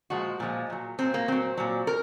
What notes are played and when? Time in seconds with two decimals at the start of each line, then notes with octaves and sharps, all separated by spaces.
0.10 A#2 F3 G#3 F#4
0.40 A#2 F3 G#3
0.70 A#2 F#3
0.99 A#2 F#3 C4
1.14 A#3
1.28 A#2 F#3 C4
1.57 A#2 F#3
1.87 A#4